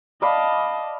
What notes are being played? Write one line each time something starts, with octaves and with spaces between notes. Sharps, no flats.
D5 D#5 F5 A5 B5